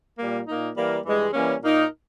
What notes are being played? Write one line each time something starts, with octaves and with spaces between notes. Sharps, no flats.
A#2 G3 A#3
A#2 A#3 D#4
E3 G3 A#3
G2 E3 G#3
E3 G3 A#3 C#4
A#2 A#3 D#4 A#4